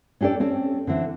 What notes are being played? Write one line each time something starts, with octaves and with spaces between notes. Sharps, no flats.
C#4 D4 G4 A4 D5
C4 C#4 A4
D3 E3 C4